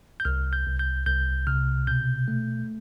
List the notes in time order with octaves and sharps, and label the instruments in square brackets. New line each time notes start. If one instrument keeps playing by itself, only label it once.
[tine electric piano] G6
C2 F6
G6
C2
G6
C2 G6
C3 F6
B2 G6
A3